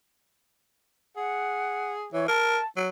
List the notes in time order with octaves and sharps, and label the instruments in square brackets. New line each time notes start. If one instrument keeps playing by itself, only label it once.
[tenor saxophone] G#4 [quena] F#5
[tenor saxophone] E3 [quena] C#5
[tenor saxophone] A#4 [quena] A5
[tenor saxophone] F#3